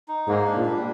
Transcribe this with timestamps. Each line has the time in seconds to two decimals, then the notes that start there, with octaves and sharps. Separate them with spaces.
0.08 D#4
0.27 G#2 A#3
0.47 D4
0.57 A#2
0.65 G3